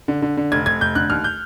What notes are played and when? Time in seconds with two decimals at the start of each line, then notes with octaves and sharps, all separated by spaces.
0.08 D3
0.22 D3
0.37 D3
0.52 F1 G#6
0.66 F1 G#6
0.81 F1 G6
0.95 D3 F#6
1.10 D#2 F6
1.24 G6